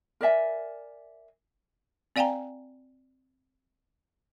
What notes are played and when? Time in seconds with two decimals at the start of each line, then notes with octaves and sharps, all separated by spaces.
0.21 A#4 D5 E5 G#5
2.16 C4 D5 F5 G5 G#5 A#5